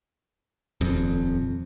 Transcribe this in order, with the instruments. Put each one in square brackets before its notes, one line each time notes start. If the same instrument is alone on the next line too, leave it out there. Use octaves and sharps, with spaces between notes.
[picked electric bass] D#1 F2